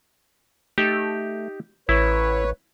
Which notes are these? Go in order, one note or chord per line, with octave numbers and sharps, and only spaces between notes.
A3 D#4 G4
A1 E4 B4 C#5